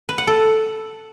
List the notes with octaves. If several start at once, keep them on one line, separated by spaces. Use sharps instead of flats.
B4
F#5
A4